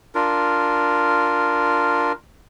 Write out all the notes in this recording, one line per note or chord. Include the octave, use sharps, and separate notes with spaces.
D4 F4 A#4